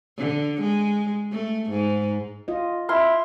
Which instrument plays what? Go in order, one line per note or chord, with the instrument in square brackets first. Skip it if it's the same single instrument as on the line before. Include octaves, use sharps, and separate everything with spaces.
[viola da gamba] D3
G#3
A3
G#2
[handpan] F4 D#5
[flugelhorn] E4 [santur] C6 [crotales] F6